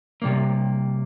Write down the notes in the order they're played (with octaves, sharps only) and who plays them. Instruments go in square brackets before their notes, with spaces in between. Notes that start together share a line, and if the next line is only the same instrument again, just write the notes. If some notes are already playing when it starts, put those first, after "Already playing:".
[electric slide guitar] C3 G3 A#3